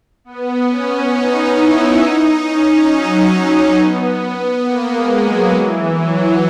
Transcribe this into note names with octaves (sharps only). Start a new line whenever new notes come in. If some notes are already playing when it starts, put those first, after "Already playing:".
B3
C#4
D#4
E4
D#4
C#4
F#3
B3
A#3
G#3
F#3
E3
F#3